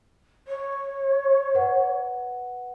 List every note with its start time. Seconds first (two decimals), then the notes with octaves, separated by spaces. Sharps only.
0.47 C#5
1.55 B4 F#5